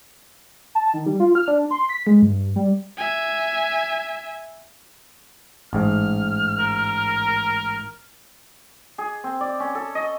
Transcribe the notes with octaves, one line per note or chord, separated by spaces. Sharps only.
A5
D#3
G3
F4
F6
D4
C6
B6
G#3
G2
G3
E5 G#5
A1 G#2 F6
A#4
G#4
C4
D5
C#4
A4
D#5